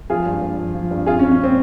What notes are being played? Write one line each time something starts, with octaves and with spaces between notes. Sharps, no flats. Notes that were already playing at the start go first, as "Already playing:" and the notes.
F3 F4 G#4
G2
G2
F3
F3
G2
F2 F4 G#4
C#4
F3
C#4
C4